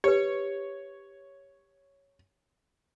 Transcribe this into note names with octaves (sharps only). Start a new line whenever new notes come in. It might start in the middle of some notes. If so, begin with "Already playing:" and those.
G4 B4 C#5